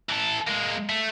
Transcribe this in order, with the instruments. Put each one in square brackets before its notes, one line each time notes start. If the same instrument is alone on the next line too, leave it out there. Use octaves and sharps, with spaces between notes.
[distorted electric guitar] E3 A4
G#3 A#3
A3